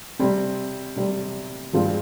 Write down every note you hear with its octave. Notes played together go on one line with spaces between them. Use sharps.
C3 G3 C4
C3 G3 C4
G2 F3 G#3 C4 F4